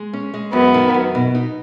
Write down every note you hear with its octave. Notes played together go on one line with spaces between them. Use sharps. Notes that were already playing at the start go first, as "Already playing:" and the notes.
Already playing: G#3
C#4
G#3
F#2 B3
D#3
F#2
B2
D#4